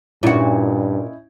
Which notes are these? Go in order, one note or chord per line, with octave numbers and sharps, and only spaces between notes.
G2 A#2 C#4 D#4 E4 F#4